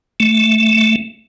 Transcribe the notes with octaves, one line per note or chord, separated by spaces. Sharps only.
A3